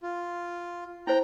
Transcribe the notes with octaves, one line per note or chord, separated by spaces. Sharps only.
F4
E4 C5 G5 A#5